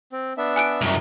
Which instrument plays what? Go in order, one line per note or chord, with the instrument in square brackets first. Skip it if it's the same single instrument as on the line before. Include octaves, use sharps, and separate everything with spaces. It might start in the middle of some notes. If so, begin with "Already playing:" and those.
[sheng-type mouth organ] C4
B3 D4 E5
[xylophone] G#5 F#6 D7
[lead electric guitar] C2 F#2